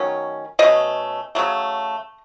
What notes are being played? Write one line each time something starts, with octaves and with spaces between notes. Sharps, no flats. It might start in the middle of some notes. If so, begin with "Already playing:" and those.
Already playing: D#3 F#3 A3 C#4
B2 A3 C#4 D#5
C#3 F#3 A3